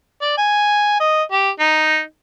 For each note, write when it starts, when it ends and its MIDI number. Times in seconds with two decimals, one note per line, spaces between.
0.21 0.36 74
0.37 0.96 80
1.00 1.23 75
1.32 1.50 67
1.59 2.01 63